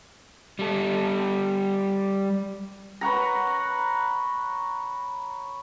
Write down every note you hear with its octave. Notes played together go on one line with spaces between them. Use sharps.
G3 A4
B4 C#5 F#5 A#5